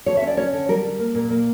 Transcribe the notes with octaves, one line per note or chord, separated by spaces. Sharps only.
D3 C#5
E5
C#4
D5
C#4 C#5
D3
G3 A#4
G3
A#3
A#2
A#3